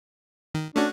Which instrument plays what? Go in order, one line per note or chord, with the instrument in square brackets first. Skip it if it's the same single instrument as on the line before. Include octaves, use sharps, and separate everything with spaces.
[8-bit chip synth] D#3
[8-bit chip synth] A3 C#4 F#4 [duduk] D4